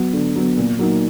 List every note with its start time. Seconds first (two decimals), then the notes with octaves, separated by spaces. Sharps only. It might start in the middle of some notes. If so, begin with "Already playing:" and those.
Already playing: F#3 B3
0.13 D3
0.36 F#3 B3
0.58 A#2
0.79 F#3 A#3 D#4